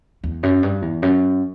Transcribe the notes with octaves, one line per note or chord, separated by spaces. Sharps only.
E2
F#2
G2
E2
F#2